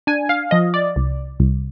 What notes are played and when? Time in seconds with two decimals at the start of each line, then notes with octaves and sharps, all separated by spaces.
0.07 D4 G#5
0.29 F5
0.51 F3 D#5
0.74 D5
0.96 C2
1.40 C2